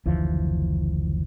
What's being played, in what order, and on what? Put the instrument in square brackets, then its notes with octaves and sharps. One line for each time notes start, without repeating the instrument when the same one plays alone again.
[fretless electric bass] F#1 D2 E3 F3